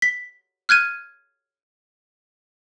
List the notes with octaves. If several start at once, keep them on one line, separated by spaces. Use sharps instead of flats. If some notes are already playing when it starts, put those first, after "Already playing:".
B6
F6 F#6 G#6 D#7